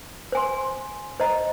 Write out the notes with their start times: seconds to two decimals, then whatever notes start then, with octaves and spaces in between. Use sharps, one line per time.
0.32 C5 G#5 C6
1.20 C5 D#5 A#5